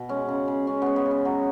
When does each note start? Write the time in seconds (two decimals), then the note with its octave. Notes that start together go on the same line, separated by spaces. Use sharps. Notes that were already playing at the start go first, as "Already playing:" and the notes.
Already playing: B2
0.09 G#3 C#4
0.28 C#3
0.48 C#3
0.67 G#3 C#4
0.82 G#3 B3
0.96 B3
1.06 C#3
1.11 C#4
1.25 F#3 G#3 F#4